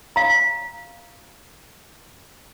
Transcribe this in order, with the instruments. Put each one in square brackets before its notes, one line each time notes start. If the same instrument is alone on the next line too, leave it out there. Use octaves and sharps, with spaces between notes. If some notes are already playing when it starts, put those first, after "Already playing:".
[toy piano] F5 A#5